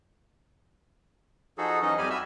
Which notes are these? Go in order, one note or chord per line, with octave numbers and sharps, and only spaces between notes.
F3 D#4 F#4 G#4 A4
E3 F#3 C#4 D#4 D#5
F2 G3 G4 G#5 B5 F6
F#4 E5 E6